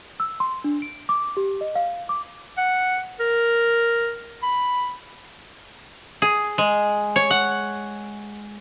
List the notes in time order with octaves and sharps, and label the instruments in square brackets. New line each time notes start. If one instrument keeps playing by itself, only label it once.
[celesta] E6
C6
D4
D7
D6
G4
D#5
F5
D6
[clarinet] F#5
A#4
B5
[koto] G#4
G#3
C#5
F#5